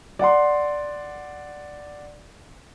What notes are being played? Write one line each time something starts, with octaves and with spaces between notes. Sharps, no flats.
D5 F#5 C6